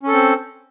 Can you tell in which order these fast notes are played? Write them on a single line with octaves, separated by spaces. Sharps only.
C#4 A4 C4